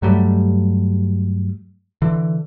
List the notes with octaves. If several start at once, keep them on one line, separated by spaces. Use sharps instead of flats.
G2 F#3 G3 A3
D3 E3